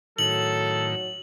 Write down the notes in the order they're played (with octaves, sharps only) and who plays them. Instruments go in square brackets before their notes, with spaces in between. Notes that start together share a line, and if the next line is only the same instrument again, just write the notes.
[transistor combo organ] A2 D#3 [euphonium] F#3 [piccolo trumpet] A4 [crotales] F#7